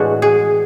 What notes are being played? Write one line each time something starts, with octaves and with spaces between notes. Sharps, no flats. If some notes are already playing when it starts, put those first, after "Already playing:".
Already playing: A2 E3 G#3 D4 F#4
G#4